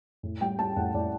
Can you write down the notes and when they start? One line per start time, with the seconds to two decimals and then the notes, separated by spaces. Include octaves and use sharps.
0.23 A2
0.41 G3 G5
0.59 G3 A5
0.76 A2 F#5
0.94 A2 D5